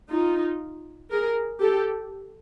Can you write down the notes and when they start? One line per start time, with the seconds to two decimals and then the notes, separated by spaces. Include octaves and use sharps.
0.11 D#4 F4
1.11 G#4 A#4
1.61 G4 A4